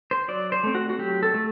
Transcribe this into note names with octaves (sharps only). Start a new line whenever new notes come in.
C5
F#3 D5
C5
A3 C4
F#4
F#4
F#3 G4
A4
A3